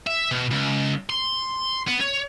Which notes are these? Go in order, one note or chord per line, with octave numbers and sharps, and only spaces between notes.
E5
B2
C#2
C6
B3
C#5